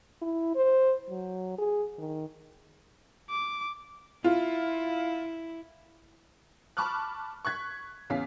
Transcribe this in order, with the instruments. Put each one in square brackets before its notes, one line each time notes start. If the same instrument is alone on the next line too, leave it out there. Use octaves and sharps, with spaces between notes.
[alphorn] E4
C5
F#3
G#4
D#3
[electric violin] D6
[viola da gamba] E4 [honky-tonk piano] F4
[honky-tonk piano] A5 B5 C#6 D6 F6 F#6
C#6 F#6 G#6 B6
E2 C#4 F5 B6